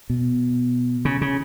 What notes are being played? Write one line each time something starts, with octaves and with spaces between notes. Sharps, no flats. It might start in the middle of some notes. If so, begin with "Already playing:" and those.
B2
C#3
C#3